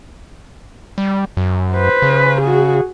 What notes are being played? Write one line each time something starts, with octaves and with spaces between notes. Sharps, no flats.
G3
F#2
B4 C5
C#3
F#4 G#4